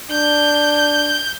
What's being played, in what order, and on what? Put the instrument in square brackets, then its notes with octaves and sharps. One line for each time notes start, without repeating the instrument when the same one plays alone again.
[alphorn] D4 [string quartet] G6